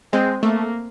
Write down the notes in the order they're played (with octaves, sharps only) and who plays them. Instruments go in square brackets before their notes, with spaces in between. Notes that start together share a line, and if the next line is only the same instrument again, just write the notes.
[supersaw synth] G#3 [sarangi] C4
[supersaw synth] A3 [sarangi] A#3